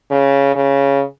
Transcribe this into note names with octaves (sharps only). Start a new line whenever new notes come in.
C#3
C#3